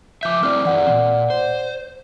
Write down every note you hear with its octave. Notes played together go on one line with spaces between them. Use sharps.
F3 E5 D6 G6
A3 C4 E4 D5 F6
E3 C4 D5 F#5
A#2
C5